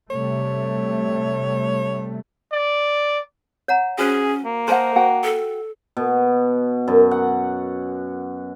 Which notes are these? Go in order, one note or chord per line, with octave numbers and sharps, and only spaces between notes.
C3 G3 A3 C#5
D5
C#5 F#5 A#5
C#4 F#4 G#4 C5
A#3
A#4 C5 D#5 F#5 G#5 A5 C6
F#4 F#5 G5
A4
B2
F#2
F#5